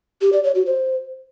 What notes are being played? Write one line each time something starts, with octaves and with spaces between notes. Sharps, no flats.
G4
D5
C#5
F#4
C5